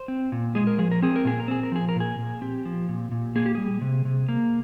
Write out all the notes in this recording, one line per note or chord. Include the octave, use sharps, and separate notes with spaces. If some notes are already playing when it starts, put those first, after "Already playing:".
Already playing: C5
C4
A#2
G#3 G#4
A#4
F3 G#4
A#4
C4 G#4
A#4
A#2 G#4
A#4
C4 G#4
A#4
F3 G#4
A#4
A#2 G#4
A#2
C4 G4
F3
A#2
A#2
A#3 G#4
G4
G3 G#4
C3
C3
A#3